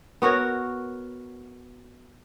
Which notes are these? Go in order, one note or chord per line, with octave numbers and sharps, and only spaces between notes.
B3 F#4 A#4 C#5